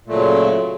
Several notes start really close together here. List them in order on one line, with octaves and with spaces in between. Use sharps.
A#2 A3 F#3 C#3